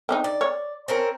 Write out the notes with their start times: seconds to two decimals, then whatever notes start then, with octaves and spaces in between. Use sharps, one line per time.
0.09 C4 D4 D#4
0.24 D5
0.41 C#5
0.88 C4 C#4 A#4